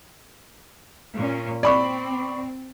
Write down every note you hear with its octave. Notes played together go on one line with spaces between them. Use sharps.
A#2 C#4
C4 D5 B5 C#6